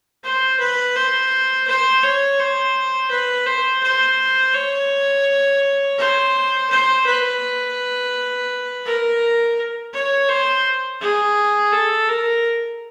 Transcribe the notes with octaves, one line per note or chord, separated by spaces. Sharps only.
C5
B4
C5
C5
C#5
C5
B4
C5
C5
C#5
C5
C5
B4
A#4
C#5
C5
G#4
A4
A#4